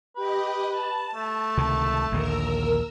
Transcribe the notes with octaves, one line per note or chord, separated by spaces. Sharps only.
G4 B4 D#5
B4 A5
A3
C#2 C3 D#3
A#1 D#2 D3 A#4 E6